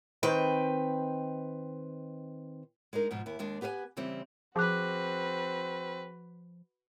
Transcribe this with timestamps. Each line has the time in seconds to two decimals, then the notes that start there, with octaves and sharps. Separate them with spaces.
0.23 D#3 C4 B4 G5
2.93 G#3 D4 D#4 A#4
3.11 G#2 B2 F3
3.26 D#2 E4
3.39 D#2 G#3 D4
3.61 B3 G4 B4 C#5 G#5
3.97 C#3 E3 G3 C4
4.56 F3 C4 F#4 G#4 B4 D6 F#6